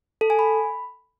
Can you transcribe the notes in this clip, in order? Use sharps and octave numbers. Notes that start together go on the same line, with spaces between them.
A4
G#5
B5